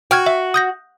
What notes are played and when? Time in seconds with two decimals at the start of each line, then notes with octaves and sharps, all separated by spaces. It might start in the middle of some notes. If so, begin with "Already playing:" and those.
0.11 F#4 G5 F6 G#6
0.26 E5
0.54 D#6 G6 A#6